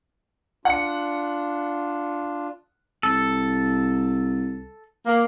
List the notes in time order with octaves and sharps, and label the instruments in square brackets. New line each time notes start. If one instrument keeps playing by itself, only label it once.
[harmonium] D4 F4 [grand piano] F#5 C#7
[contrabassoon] C2 [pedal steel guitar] A4
[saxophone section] A#3